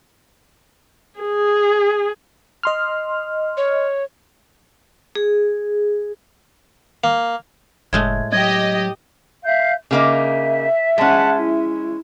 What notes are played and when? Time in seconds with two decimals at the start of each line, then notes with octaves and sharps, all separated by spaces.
1.20 G#4
2.63 D#5 C6 F6
3.57 C#5
5.15 G#4
7.04 A#3
7.93 F#1 A2 G#3 A3 G#6
8.32 F#3 G4 D#5 G#6
9.44 E5 F5 G6
9.91 C#3 A#3 D#4 E5
10.98 G#3 C#4 F#5 A5
11.36 E4